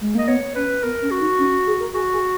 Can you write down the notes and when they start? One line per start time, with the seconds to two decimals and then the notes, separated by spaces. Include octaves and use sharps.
0.01 G#3
0.15 A#3 D#5
0.28 B3 C#5
0.55 C#4 B4
0.83 B3 A#4
1.02 C#4
1.11 F#4
1.20 D#4
1.39 C#4
1.66 G#4
1.80 A#4
1.94 F#4 G#4
2.12 G#4